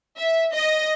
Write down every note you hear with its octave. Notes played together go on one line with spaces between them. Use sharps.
E5
D#5